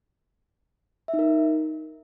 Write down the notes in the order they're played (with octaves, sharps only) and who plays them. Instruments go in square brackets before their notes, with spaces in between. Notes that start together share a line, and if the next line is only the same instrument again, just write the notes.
[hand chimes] E5
D#4
A#4